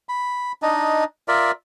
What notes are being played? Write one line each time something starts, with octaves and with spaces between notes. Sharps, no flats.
B5
D4 D#4 D#5
F4 A#4 D5 E5